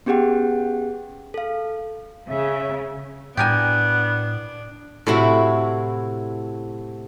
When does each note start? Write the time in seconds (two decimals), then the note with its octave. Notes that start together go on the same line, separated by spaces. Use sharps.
0.06 B3 C#4 G4 G#4 F#5 G5
1.34 A4 F5
2.30 C#3 E5
3.37 A2 B3 D4 G4 A#4 G#5
5.07 A2 C3 E4 F#4